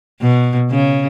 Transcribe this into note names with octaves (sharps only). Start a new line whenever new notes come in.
B2
C#3